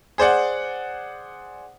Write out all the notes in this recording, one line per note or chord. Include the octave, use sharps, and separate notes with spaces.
G#4 C5 D5 F#5